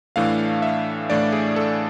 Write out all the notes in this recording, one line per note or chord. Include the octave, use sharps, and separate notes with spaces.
A2 E3 A3 D4 F5
E5
A2 E3 A3 D4 D5
G#4
A4